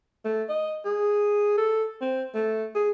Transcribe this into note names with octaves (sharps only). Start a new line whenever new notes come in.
A3
D#5
G#4
A4
C4
A3
G#4